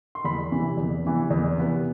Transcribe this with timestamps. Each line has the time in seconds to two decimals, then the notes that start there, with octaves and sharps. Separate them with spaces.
0.15 C6
0.24 E2 B5
0.51 C3 E3 B3
0.77 E2
1.04 C3 E3 B3
1.30 E2
1.57 C3 E3 B3